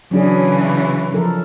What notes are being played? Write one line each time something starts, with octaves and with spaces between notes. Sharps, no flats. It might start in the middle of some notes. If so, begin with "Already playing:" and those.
C#3 E3 F#3 D4 G#4
F3 A4 A#4